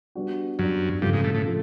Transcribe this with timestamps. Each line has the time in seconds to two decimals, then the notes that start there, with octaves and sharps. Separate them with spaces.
0.15 G3 B3 D4 F#4
0.59 F#2 G3 B3 D4 F#4
1.02 G2 C#3 F3 A3
1.13 G#2
1.24 A2
1.35 A2
1.45 C#3 F3 A3